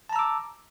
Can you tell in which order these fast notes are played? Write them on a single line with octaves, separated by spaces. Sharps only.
A5 A#5 E6 D6